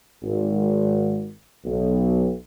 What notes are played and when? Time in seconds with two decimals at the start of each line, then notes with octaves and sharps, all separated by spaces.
0.23 G#1
1.65 B1